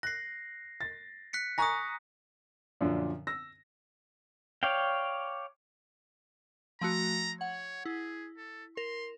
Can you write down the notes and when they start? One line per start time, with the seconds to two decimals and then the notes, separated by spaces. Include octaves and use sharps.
0.03 F#6 A#6 C7
0.81 A6
1.33 F#6 B6 C#7
1.58 G#5 A#5 C#6 D#6 F#6 A#6
2.81 F#2 A#2 D3 F3 D4
3.27 E6 A#6
4.63 C#5 D5 F5 G5
6.81 F3 A3 F#4 A#5
7.41 C#5 F#5
7.85 E4 G#4
8.37 A4
8.77 A#4 C6